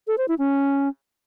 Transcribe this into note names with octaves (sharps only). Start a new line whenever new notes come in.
A4
C5
E4
C#4